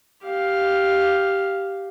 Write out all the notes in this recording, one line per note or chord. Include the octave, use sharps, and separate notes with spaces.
G4 F5